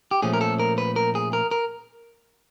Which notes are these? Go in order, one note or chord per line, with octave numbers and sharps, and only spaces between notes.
G4
A#2 F3 A3 C#4 G#4
A#4
A4
A#4
B4
A#4
G#4
A#4
A#4